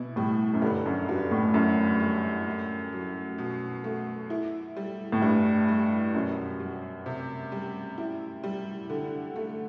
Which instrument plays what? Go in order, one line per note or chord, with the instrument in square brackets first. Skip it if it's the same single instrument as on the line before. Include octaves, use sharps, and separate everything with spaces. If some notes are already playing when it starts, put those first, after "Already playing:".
Already playing: [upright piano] B2 [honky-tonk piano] E3 E4
[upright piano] A2 [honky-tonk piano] G3
[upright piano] F#2
[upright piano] G2 [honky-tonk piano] D3
[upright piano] F#2
[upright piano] G2 [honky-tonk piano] F#3
[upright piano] A2
[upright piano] F#2 [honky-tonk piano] E4
[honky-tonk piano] G3
A2
F#3
B2
A3
E4
G3
[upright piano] A2
[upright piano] G2 [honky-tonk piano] E4
[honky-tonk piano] G3
[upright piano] F#2 [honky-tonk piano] B2
[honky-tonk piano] G3
C3
G3
E4
G3
D3
A3